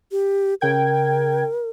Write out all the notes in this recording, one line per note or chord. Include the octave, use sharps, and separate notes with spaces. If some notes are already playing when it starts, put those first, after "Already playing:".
G4
C#3 A#4 G5 G#6